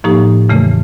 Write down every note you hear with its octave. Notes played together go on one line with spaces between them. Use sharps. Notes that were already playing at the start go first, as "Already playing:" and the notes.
A2 F3 A#3 D#4 G4
E2 C#3 E3 A3